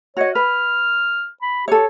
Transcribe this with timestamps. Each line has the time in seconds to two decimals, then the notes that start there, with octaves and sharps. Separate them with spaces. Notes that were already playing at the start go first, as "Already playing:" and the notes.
0.17 F#4 C#5 D#5
0.35 B4 F6
1.42 B5
1.68 G4 A4 C#5